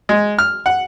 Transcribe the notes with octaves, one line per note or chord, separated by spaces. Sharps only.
G#3
F6
F#5